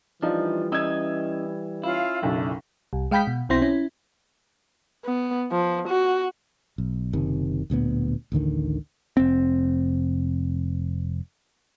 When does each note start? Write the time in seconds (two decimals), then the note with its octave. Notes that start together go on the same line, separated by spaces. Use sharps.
0.22 E3 F3 G3 D4 D#4 F4
0.72 C#4 E4 D#5 E6 G#6
1.84 C#4 E4 F4 F5
2.22 F#1 B1 F#2 D4
2.93 C2
3.11 G#3 F5 G5 B5 G6 B6
3.27 B2
3.49 B1 B2 C4 E4 C6 A#6
3.62 C#4 E4
5.05 B3
5.52 F3
5.88 F#4
6.78 B1
7.13 F#1 C3 D#3
7.70 D1 D2 A#2 B3
8.32 A1 D2 D3 D#3
9.17 F1 C4